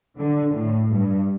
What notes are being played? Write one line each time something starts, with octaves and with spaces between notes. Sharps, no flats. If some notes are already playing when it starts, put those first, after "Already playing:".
D3
A2
G2